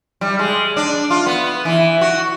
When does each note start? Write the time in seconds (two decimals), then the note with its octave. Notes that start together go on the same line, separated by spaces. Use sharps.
0.21 G3
0.39 G#3
0.77 D4
1.10 F4
1.26 B3
1.65 E3
2.01 F#4